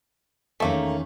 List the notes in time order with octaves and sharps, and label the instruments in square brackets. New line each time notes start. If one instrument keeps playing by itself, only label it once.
[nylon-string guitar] E2 D#3 C#4 [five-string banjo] A3 A#3